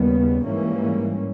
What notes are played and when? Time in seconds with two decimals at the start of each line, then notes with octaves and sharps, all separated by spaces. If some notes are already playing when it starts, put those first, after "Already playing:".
Already playing: D#2 C#3 G3 B3
0.44 G#2 E3 G3 A#3 C#4